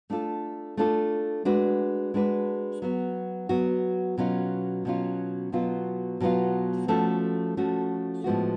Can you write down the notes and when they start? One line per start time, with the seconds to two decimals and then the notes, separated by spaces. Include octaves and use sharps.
0.10 A3 D4 F4 A4
0.77 A3 D4 F4 A4
1.45 G#3 D4 F#4 B4
2.14 G#3 D4 F#4 B4
2.82 F#3 B3 F#4
3.49 F#3 B3 F#4
4.18 B2 F#3 C#4 F4
4.85 B2 F#3 C#4 F4
5.52 B2 F#3 B3 F4
6.20 B2 F#3 B3 F4
6.88 F3 A3 C#4 F#4 A4
7.57 F3 A3 C#4 F#4 A4
8.24 A2 F3 G#3 B3 F#4